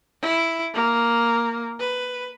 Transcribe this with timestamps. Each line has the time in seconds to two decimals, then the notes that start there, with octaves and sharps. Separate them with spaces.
0.22 E4
0.74 A#3
1.80 B4